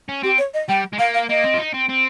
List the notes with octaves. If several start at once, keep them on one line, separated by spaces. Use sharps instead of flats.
C#4
C4 G4
C#5
D#5
G3 G5
G#3
A#3 F5
F5
A#3 D#5
C4
F4
D#4
C4
C4